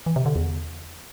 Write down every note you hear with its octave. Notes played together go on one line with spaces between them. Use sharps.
E3
C3
D3
E2